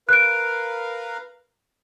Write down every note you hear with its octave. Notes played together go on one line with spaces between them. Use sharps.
A#4 B4 F5 F#6 D7